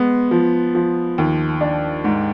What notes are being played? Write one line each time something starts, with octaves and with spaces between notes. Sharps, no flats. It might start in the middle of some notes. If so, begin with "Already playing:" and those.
Already playing: G#3 B3
F3
F3
D#2
D4
G#2